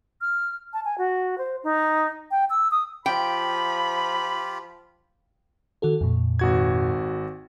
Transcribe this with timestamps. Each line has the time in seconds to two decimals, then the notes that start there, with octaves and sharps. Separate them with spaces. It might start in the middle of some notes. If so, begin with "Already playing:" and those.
0.21 F6
0.73 A5
0.85 G#5
0.98 F#4
1.38 C5
1.64 D#4
2.31 G5
2.50 E6
2.71 D#6
3.06 F3 F4 G4 G5 B5
5.82 D#3 F#4 A4
6.01 F2 A#2
6.39 G#1 F#4 G#6